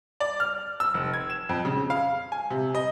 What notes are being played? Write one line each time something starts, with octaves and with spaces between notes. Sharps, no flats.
D5
F6
E6
F1
G#6
E7
F2
C#3
F5
G#5
C3
D#5